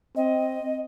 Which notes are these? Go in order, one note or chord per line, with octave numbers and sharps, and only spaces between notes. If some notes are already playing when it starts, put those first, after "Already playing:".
C4 D#5